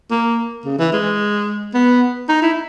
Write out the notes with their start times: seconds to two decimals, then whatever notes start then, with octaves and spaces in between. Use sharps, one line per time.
0.11 A#3
0.65 C#3
0.78 E3
0.93 G#3
1.74 B3
2.29 D#4
2.42 E4